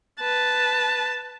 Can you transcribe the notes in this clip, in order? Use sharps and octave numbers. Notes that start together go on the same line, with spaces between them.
B4 A5